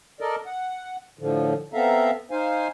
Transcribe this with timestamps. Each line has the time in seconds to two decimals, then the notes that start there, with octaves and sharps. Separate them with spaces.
0.21 A4 A#4 D5 D#5
0.46 F#5
1.19 A2 D3 F3
1.74 B3 C4 A4 E5 F5 A#5
2.31 D#4 C5 F5 G#5